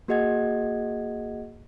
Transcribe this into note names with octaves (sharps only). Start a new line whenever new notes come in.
A#3 F#4 G#4 D#5 F#5 G#6